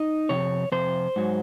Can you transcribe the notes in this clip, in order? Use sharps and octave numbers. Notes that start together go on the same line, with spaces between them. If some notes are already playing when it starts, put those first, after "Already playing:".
Already playing: D#4 D#5
F2 C3 C#5
F2 C3 C5
G#2 F#3